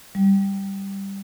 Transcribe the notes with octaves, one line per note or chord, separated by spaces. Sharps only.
G3